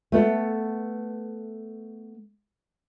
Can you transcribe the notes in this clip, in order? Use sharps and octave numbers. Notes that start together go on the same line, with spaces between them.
A3 B3 A4